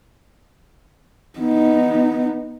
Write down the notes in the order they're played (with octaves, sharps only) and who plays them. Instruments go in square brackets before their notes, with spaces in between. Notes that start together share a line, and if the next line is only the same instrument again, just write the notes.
[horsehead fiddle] B3 D#4